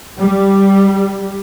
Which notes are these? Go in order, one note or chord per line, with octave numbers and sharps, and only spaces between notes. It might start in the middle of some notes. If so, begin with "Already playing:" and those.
G3